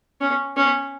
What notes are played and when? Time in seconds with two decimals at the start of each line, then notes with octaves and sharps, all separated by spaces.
0.21 C#4
0.57 C#4